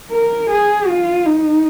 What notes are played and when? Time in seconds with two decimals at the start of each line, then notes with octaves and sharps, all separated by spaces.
0.11 A#4
0.50 G#4
0.88 F4
1.26 D#4